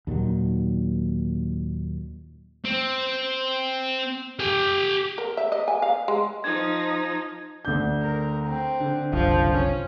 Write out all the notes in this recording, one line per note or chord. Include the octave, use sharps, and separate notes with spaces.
D#2 A#2 D#3 F#3
C4
G4 G#5
A#4
E5
D#5
G#5
F5
G#3
F3 D#4 G#6
D2 D4 G6
A#4
C4
D3
F#1 C2 F3
C#4